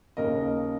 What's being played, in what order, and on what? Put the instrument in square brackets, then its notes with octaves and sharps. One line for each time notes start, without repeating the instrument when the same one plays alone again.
[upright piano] D#2 C#3 A#3 A#4 D#5